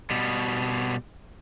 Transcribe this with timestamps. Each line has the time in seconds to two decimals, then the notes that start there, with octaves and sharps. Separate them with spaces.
0.10 B2 G3